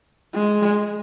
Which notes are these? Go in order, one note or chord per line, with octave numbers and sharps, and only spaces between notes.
G#3